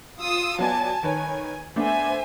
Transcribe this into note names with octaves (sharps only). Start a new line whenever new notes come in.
F4 D#6 E6
F#3 B3 D5 G#5 A5
D#3 B4 C#5 G#5
A3 B3 D4 C5 E5 G#5